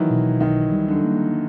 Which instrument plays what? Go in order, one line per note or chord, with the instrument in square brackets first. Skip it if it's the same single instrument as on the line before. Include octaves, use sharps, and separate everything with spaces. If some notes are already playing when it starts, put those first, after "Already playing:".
Already playing: [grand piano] D#3 E3 F#3 [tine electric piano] A#3
[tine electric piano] B2
[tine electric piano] B1 [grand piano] D#3
[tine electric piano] G3
[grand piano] D3
[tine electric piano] A#3